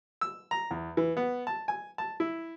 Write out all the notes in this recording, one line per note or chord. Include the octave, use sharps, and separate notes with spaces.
E6
A#5
E2
E3
B3
A5
G#5
A5
E4